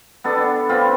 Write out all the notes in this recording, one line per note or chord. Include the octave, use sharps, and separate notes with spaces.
B3 D4 A4
C4 F4 B4